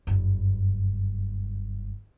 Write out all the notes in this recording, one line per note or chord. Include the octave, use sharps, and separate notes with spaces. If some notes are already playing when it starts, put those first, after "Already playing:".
F#1 G2